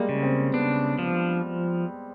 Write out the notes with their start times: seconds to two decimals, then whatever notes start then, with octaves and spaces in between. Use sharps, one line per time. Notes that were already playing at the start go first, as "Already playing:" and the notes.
Already playing: G3 G#3 A#3
0.09 C#3
0.23 C4
0.53 B3 D4
0.99 F3